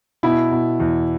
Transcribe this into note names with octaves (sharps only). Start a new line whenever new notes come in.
B2 E4
B2
E2